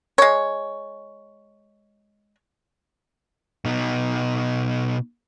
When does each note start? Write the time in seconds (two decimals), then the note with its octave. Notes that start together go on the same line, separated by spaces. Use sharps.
0.18 G#3 C#5
3.65 B2 D#4